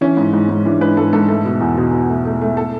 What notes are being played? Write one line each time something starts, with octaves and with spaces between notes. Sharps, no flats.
E3 C#4
G#2
G#2
G#2
E3 D4
G#2 B4
G#2 A4
G#2 A4
A3 A4
B2
E2
B2
B2
A3
A3
A3
A4